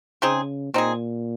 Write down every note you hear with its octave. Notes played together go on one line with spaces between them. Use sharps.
C#3 C4 D#4 G#4
A#2 C4 D#4 G#4